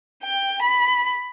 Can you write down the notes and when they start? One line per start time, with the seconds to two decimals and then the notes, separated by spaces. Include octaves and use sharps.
0.23 G5
0.63 B5